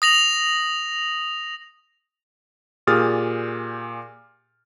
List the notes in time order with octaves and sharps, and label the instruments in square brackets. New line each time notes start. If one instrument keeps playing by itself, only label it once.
[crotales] D#6 A#6 F7 F#7
[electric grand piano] A#2 G4 G#4 D#6 F6 A6